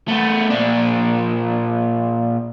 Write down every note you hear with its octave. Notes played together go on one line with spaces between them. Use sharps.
A3 B3
A#2 D4